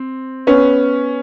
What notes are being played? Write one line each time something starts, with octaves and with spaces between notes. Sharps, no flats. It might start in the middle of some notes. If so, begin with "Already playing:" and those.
Already playing: C4
B3 C#4